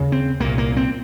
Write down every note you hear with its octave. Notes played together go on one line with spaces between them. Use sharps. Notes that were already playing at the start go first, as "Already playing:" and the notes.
Already playing: D#2 C#3
C4
C2 A#2 A#3
A#3
C4